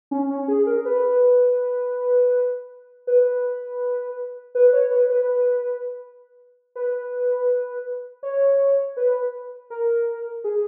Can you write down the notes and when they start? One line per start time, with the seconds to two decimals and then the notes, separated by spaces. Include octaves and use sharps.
0.11 C#4
0.30 C#4
0.48 G#4
0.67 A#4
0.85 B4
3.07 B4
4.55 B4
4.73 C#5
4.91 B4
5.10 B4
6.76 B4
8.23 C#5
8.97 B4
9.70 A#4
10.44 G#4